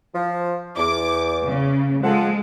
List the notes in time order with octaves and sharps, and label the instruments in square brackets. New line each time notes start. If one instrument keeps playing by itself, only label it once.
[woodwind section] F3
[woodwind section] E2 [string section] D6
[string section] C#3
[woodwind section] F3 A4 F#5 [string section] G#3